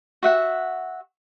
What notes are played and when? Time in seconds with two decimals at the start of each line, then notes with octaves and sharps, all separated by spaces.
0.23 F#4 E5 F#5